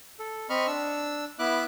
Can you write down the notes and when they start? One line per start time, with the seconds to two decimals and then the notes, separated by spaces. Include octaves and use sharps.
0.19 A4
0.49 C4 D#5 B5 C#6 F6
0.67 D4 E6
1.39 B3 E4 E5 D6 F#6